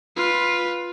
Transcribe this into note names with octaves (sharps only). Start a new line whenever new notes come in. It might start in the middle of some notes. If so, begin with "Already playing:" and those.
F4 B4